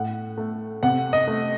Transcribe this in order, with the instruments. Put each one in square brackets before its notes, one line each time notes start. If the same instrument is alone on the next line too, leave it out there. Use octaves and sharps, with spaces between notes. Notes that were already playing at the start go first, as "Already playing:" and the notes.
Already playing: [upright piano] A2 F#5
A3
C3 F#5
D#5
A3